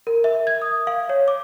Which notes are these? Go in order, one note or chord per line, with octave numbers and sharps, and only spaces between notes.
A#4
E5
G#6
D#6
F5
C#5
D6